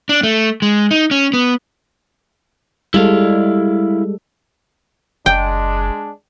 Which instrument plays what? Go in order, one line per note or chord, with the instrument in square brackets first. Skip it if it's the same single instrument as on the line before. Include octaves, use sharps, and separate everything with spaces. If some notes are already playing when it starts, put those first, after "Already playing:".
[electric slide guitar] D4
A3
G#3
D#4
C#4
B3
[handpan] G3 G#3 A4 [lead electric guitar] E4 F5
[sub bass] F#1 [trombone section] G#3 D4 [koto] G5